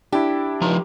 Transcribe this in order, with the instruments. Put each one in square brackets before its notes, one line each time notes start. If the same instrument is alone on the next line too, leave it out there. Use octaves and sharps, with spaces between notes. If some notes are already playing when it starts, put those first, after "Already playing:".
[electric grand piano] D4 E4 [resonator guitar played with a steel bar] G4
[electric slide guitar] F3 D#4 A#5